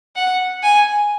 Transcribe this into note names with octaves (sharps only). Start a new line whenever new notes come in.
F#5
G#5